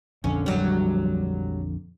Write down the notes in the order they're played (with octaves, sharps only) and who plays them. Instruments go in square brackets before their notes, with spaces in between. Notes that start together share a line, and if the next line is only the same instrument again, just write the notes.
[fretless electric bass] A#1 F2 D3 [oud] C#4
[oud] F#3 G3